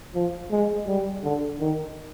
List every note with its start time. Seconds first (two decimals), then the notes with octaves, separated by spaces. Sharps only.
0.15 F3
0.51 G#3
0.87 G3
1.23 D3
1.60 D#3